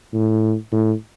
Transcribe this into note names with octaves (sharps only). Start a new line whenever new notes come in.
A2
A2